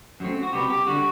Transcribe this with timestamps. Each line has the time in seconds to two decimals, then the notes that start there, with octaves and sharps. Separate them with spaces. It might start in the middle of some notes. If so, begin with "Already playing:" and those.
0.20 F#2 F#3 A3 C4
0.43 F#4
0.53 C3 G3 B3 G4
0.70 G4
0.87 D3 G3 F#4